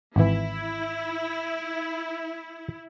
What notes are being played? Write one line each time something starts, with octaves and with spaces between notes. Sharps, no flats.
G#1 E3 E4